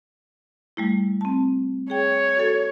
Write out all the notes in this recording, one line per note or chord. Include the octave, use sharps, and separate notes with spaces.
G3 A3 E4
C4 A5
G#4 C#5 G5
F#4 A4